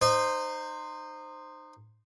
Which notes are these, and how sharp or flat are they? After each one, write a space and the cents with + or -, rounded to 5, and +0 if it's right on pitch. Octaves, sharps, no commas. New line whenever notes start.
D#4 -25 C5 +0